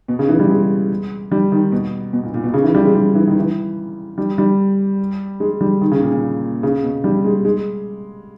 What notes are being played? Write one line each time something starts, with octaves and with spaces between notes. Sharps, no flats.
B2
C#3
E3
G3
G#3
G3
D#3
B2
B2
A#2
A#2
B2
C#3
E3
G3
G#3
G3
E3
D#3
E3
G3
G3
G#3
G3
D#3
C#3
A#2
A#2
C#3
B2
G3
G#3
G#3